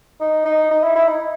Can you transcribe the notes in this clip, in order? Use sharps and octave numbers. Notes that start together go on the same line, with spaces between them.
D#4
D#4
D#4
E4
E4
D#4